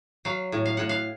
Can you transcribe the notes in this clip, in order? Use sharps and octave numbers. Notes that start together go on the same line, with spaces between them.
F#3 F5
A2
F5
A2 F#5
F5